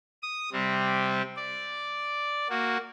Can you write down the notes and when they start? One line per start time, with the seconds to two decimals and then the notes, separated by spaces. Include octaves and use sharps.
0.23 D#6
0.52 C3 G3 C4
1.36 D5
2.50 A#3 F#4